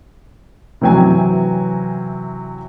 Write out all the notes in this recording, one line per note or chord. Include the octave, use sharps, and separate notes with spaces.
C3 E3 F#3 G5 G#5